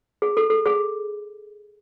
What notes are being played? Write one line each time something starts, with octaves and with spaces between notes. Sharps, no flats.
G#4
A4
A4
G#4